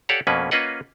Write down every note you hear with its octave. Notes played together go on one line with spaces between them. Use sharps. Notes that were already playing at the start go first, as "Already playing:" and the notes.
G4 A4 C#5 D5 F5 F#5
F2 B2 A#3 C#4 B4
A#3 C#4 F4 B4 D#5 F#5